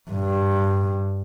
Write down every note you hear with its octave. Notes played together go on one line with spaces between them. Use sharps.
G2